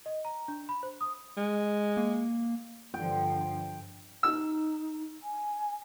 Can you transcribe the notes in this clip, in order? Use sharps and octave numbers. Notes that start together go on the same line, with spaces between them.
D#5
A#5
D4
B5
C5
D#6
G#3
A#3
G2 D3 F3 G5
D#4 E6
G#5